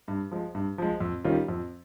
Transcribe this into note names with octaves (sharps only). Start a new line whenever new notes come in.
G2
F3 G#3
G2
F3 G#3
F2
D#3 G3 C#4 F4
F2